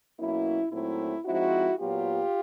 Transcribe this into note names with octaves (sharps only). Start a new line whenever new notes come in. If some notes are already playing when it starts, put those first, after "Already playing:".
B2 F#3 A#3 C#4 E4
A#2 F#3 A3 C4 D#4 E4
F3 G#3 C4 D#4 E4 F#4
A#2 F#3 B3 F4 G4